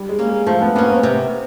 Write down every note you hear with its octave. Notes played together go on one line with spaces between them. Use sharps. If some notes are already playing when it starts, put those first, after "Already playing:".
Already playing: G3
G#3
A#3 C#4
G#3
F3 A3
B3
A#3 B3 C#4
C4
C3